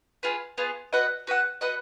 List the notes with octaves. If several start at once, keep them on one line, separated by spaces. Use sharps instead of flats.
B3 F4 G#4
B3 F4 G#4
F#4 B4 D#5 F#5
F#4 B4 D#5 F#5
F#4 B4 D#5 F#5